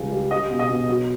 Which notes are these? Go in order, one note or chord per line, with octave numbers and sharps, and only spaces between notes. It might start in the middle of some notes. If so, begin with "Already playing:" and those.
Already playing: C#2 G3
G3
G3 D#5
B2
D#5
B2
F#3